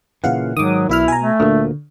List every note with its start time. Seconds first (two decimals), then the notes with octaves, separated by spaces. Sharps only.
0.24 A#2 C#3 E3 F5 F#5
0.57 G#2 D#3 F#3 D6 D#6
0.89 B1 B2 E4 E5 F6
1.08 G#5 A#5
1.21 A3
1.40 D2 A#2 D3 A#3